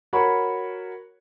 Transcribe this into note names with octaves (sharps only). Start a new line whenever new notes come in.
F#4 A#4 C#5 B5